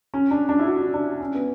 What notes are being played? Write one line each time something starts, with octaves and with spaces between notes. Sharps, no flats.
C#4
D4
D4
E4
F#4
D4
C#4
B3